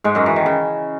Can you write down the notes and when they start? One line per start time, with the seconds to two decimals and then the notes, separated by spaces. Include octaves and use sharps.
0.04 G#2 G#3
0.15 F#2 F#3
0.26 E3
0.36 D#3
0.46 C#3